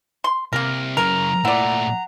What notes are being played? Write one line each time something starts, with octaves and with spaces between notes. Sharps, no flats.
C6
C2 A#3 A#4
F#2 C#3 A#4 A#5
A#2 A3 E4 D5 F#5